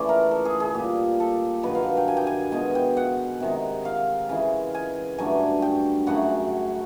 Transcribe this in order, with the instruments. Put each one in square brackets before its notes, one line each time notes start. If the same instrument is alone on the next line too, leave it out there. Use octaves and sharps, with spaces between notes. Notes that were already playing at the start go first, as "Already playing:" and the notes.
Already playing: [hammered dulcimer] C#3 E3 A3 D5
A#4
A4
G#4
G#4
A#2 G3 G4
A4
G2 D#3 F#3 B4
F5
G5
G#5
G5
G#5
B2 G#3 G#5
G5
F#5
C3 D#3 G#3
F5
C#3 E3 G#3
G#5
G2 D3 F#3 A3 G#5
G5
F#2 C#3 F#3 A3 F#5